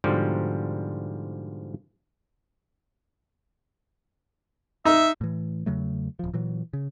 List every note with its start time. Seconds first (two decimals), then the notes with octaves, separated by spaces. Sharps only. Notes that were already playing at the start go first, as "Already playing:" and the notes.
0.04 G#2 B2 D3 F3 G3
4.85 D#4 E5
5.21 A2 E3
5.66 E2 C#3 F#3 A3
6.19 D1 F3
6.34 A#2 E3 F#3
6.73 C#3